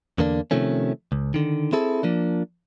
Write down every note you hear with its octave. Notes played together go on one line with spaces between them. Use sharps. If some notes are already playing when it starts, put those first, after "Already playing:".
E2 D3 A#3 D4
C3 D#3 F3 A3 C#4
C#2
D3 D#3
C4 E4 G#4 A4
F3 A#3 D4